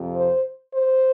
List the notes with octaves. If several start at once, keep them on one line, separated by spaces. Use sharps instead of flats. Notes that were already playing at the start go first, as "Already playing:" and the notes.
Already playing: F2 C3 F3
C5
C5